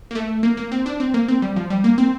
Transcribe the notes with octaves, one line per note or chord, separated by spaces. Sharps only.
A#3
A3
A#3
A#3
C4
D4
C4
A#3
C4
G3
F3
G3
A#3
C4